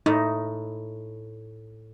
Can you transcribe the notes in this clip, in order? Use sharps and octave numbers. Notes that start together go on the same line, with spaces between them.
A2 D#4